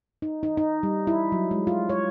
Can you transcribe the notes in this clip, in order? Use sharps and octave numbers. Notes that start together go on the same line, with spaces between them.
D#4
D#4
D#4
G3
E4
F#3
G#3
F4
C#5